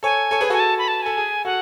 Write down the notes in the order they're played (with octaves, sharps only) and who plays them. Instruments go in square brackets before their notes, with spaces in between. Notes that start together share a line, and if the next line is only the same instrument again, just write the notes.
[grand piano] A4 C#5 [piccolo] G#5
[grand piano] A4 C#5
G#4 B4
[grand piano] F#4 A4 [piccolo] G#5
[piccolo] A5
B5
A5
[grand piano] A4 [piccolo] G#5
[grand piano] G#4
[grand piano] F#4 A4 [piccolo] F#5